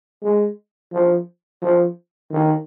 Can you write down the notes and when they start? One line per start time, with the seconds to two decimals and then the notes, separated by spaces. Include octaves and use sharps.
0.22 G#3
0.92 F3
1.62 F3
2.31 D#3